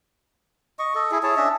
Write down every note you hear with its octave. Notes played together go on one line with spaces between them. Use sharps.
D#5 C#6
A4 D#5
E4 G#4
E4 G#4 C#5 A5
C#4 D4 D#5 E5